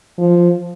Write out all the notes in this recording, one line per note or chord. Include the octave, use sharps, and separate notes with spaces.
F3